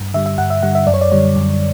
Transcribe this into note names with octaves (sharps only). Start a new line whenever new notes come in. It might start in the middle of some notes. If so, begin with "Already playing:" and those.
Already playing: G2
D3 G3 E5
E5
G2 F#5
E5
D3 G3 F#5
E5
F#2 D5
C#5
D5
D3 G3 C#5
F#2